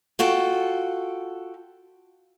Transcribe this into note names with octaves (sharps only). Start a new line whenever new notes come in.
F4 F#4 A4 G5